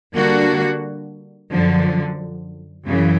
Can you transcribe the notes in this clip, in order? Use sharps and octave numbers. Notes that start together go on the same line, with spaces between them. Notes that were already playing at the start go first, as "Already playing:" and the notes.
D3 G3 A#3 D4 F#4
F#2 D3 F3
F#2 C#3 E3